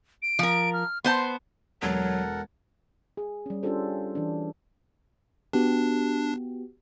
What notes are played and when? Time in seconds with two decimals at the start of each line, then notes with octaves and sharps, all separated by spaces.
0.22 D7
0.39 F3 A#4
0.73 F6
1.04 B3 C5 A5 C6
1.82 E1 F#3 A4 A#4 F#5 G#6
3.17 G#4
3.46 G3 C#4
3.63 C#4 D4 F4 G4 A4 C5
4.15 E3 D4
5.53 B3 D4 F#4 G4